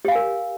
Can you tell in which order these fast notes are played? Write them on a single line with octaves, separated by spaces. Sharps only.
G4 F5 G#5 A#4